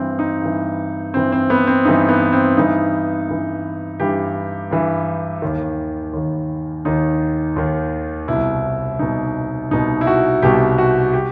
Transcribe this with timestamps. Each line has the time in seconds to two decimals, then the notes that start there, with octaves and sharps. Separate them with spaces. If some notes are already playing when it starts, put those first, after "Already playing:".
Already playing: G2 E3 C4
0.19 D#4
0.42 G2 E3
1.13 G2 E3 C4
1.32 C4
1.50 B3
1.67 C4
1.85 G2 E3 D#4
2.09 B3
2.33 C4
2.56 G2 E3 D#4
3.28 G2 E3
4.00 G2 E3 G4
4.71 G2 E3
5.42 D#2 D#3
6.13 D#2 D#3
6.85 D#2 D#3 D#4
7.56 D#2 D#3
8.28 C2 B2 E4
8.99 C2 B2 D#4
9.71 C2 B2 D#4
10.01 E4
10.07 F#4
10.42 C2 B2 G4
10.78 F#4
11.13 G4